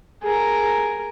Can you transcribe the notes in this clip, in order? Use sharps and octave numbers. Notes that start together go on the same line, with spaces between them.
G#4 A#4